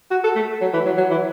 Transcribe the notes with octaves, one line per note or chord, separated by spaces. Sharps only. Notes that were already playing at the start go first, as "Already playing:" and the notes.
F#4
A4
A3
F#3
E3
F#3
F#3
E3